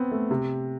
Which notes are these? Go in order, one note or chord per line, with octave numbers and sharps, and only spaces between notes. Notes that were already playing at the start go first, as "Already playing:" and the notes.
Already playing: B3 C4
A3
C3